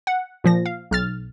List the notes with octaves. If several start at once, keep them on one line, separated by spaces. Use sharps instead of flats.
F#5
A#2 F3 A#6
F5
B1 F6 A6